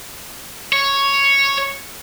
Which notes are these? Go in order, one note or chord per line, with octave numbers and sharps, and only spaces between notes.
C#5